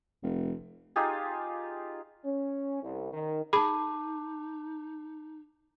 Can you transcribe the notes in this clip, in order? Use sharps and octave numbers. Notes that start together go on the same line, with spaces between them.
F1
D#4 F4 G4 G#4
C#4
C2
D#3
D#4 G#4 A5 B5 D6